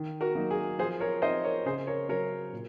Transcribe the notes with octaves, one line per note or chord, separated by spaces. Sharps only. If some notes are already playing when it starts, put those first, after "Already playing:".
Already playing: D#3
F#4 A#4
F#3 A#3 D#4
G#4
F3 G#4 C5
A#4 C#5
C4 D#4 C5 D#5
A#4 C#5
C#3 G#4 C5
A#4 C#5
F#3 C#4 A#4 C#5
A#2